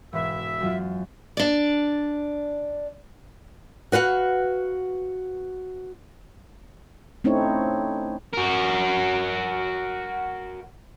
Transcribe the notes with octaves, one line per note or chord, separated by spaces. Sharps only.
E1 G#2 B4 E5
F#2 F#3 F4
D4 D5
F#4 B4 F5 F#5
A3 C4 C#4 D#4 E4 C#5
F#4 A#4